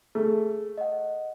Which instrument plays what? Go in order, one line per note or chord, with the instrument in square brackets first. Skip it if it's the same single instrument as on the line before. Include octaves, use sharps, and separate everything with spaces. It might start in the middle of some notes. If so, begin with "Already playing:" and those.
[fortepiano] A3 [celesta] G#4
[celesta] D#5 F#5